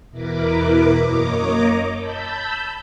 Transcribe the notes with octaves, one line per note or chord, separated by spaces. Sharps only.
E2 B2 E4 A#4 B4 D6
F#2 A#3 C#5 D#5 A#5 D6
A5 B5 E6 G6